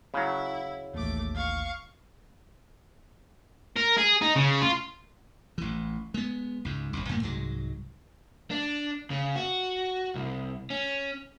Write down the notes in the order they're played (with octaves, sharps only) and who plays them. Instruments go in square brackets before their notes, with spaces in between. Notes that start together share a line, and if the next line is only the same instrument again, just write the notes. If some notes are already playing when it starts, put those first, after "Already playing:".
[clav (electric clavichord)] C#3 F#3 [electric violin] E4
[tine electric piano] A1 D#2 [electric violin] A3 D6
[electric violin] F5 C#6
[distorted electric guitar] A#4
G#4
D#4
C#3
F4
[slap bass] A1 E3
G#3 B3
C#2 G#2
G1 C2
G2 A#2 A3 A#3
C2 G#2 F#3 G#3
[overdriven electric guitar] D4
C#3
F#4
C2
C#4